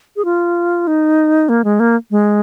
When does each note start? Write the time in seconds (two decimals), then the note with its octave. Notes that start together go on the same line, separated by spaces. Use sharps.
0.16 G#4
0.25 F4
0.87 D#4
1.49 A#3
1.64 G#3
1.80 A#3
2.11 G#3